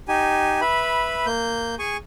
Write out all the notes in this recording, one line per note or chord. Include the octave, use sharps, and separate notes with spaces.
D#4 G4 G#5
B4 E5 B5
A#3 G6
G#4 G#5 C#6